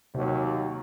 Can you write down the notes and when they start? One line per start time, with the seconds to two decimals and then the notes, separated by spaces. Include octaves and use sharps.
0.15 D#2 C3 F#3